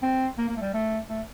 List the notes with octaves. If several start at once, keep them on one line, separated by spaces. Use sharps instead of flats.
C4
A#3
A#3
A3
G3
A3
A3